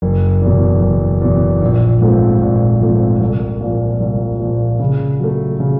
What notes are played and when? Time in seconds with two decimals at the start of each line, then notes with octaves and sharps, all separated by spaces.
0.02 F#1
0.42 E2 B2
0.82 F#1
1.21 E2 B2
1.62 A#1
2.01 G#2 F3 A3 C4
2.41 A#1
2.81 G#2 F3 A3 C4
3.20 C2
3.61 A#2 F3
4.00 C2
4.40 A#2 F3
4.80 C#3
5.19 F#3 A3
5.60 C#3